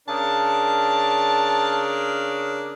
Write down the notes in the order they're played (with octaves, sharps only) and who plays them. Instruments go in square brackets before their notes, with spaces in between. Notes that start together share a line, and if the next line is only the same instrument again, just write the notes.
[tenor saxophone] C#3 [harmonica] D4 A#4 [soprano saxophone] A5